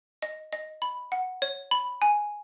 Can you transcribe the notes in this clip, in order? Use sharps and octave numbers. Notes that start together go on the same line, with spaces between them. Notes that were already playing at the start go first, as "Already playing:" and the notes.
D#5
D#5
B5
F#5
C#5
B5
G#5